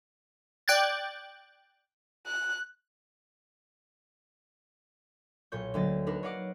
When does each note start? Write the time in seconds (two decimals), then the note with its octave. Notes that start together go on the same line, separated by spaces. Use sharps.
0.68 D5 G5 F#6 G#6 A6
2.26 F#6
5.52 B1 A#2 C#5 G6
5.74 D2 D3 F#3 A#3 D#5 A6
6.07 D4 D#4 A#4 B4
6.23 C#5 D#5 F5 F#5 D6